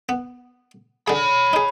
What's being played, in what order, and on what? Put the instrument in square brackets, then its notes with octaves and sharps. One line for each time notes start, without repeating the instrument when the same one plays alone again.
[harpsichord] B3
[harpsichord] D3 G#4 [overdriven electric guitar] C#5 B5
[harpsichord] D#4 G#4